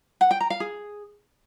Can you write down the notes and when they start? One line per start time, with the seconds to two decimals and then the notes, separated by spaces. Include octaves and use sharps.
0.21 F#5
0.31 G5
0.41 A#5
0.50 F5
0.60 G#4